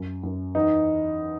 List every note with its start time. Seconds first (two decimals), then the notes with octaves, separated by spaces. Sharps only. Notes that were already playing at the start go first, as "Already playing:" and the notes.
Already playing: F#2
0.23 F#2
0.55 E2 D#4